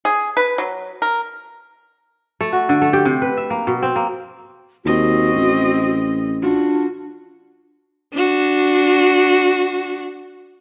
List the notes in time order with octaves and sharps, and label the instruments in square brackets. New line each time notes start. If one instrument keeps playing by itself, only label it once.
[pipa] G#4
B4
F#3
A#4
[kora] A3
F#4
D3
A3
G4
C3
B4
E5
A#3
B2
C4
A#3
[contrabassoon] D#2 [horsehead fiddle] C4 D#5 [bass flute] F#4
[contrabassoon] A1
[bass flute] D4 [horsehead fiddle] F4 F#4
[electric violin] D4 F#4